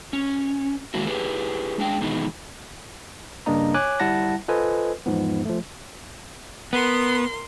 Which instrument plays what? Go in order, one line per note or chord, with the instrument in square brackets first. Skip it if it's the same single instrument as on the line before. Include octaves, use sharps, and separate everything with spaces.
[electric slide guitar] C#4
D#3 G#3 A#3 E4 F#4
E4 G4 G#4 B4
G#3 D4 G5
B2 D#3 E3 G#3 D#4 E4
[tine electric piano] G2 C#3 A#3 D4 D#5 A#5
C#5 G#5 D6 F#6
G1 G3 E4 F#5 A5 A#6
F4 A4 B4 C5 D#5 G#5
E2 G#2 F3 B3
F3 A3
[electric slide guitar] B3 [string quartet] A#4 C6